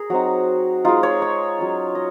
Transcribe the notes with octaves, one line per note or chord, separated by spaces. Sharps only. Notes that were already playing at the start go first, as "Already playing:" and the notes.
Already playing: G#4 A#4
F#3 C4 D#4 F#4
G#3 D#4 F4
C#5
C#5
F#3 C#4 F4
D#5